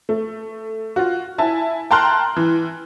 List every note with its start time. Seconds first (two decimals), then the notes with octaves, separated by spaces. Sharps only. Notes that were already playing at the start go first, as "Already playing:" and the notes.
0.09 A3
0.96 F4 F#4
1.38 E4 G#5 A5
1.91 G5 A5 A#5 C6 F6 F#6
2.36 E3